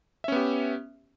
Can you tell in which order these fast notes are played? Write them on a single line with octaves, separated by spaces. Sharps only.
E5 C#4 B3 G4